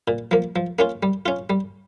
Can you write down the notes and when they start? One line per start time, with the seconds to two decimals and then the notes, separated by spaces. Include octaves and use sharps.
0.08 A#2
0.31 F3 A#3
0.56 F3
0.79 A#3 C#4 F4
1.03 G3
1.26 C#4 F4
1.50 G3